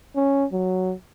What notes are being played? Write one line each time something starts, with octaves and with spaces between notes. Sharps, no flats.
C#4
F#3